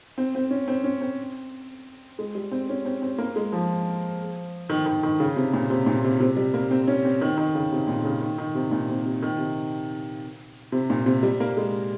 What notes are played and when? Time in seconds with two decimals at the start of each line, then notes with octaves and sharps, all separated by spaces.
0.18 C4
0.35 C4
0.51 C#4
0.68 C4
0.84 C#4
1.01 C4
2.19 G#3
2.35 G3
2.51 C4
2.69 C#4
2.85 C4
3.02 C4
3.18 A#3
3.36 G#3
3.52 F3
4.69 D#3
4.86 D#3
5.03 D#3
5.20 C#3
5.36 C3
5.53 A#2
5.70 C3
5.86 A#2
6.04 C3
6.20 C3
6.37 G3
6.54 A#3
6.71 C4
6.88 C#4
7.04 C4
7.21 D#3
7.37 D#3
7.55 C#3
7.72 C3
7.88 A#2
8.05 C#3
8.21 D#3
8.38 D#3
8.55 C3
8.71 A#2
8.89 C3
9.06 C3
9.22 D#3
9.38 C3
10.72 C3
10.90 A#2
11.06 C3
11.23 G3
11.40 A#3
11.57 G#3